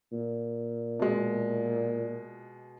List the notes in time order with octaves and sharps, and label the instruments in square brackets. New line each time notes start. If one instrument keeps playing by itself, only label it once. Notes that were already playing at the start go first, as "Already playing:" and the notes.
[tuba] A#2
[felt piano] B2 G#3